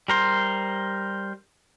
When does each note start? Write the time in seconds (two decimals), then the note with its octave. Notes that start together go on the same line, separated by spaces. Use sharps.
0.08 G3 A#4 C5